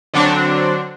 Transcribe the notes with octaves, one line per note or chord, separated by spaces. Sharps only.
D3 F#3 C4 D4